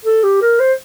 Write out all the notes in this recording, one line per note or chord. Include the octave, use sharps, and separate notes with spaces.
A4
G4
A#4
C5